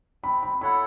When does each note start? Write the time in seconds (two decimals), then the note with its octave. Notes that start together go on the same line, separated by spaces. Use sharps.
0.24 C4 B5
0.43 B5
0.61 E4 A4 C#5 F#5 B5